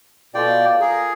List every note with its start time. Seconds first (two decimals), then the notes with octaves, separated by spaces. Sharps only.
0.35 B2 F4 A4 D5 G5
0.81 G#4 A#4 A#5